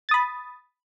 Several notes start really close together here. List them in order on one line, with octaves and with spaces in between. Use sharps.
A6 D#6 B5